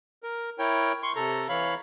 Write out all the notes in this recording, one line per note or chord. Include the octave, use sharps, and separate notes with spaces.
A#4
E4 A#4 C#5 G5
C6 C#6
C3 A4 A#5
E3 C#5 F5 B5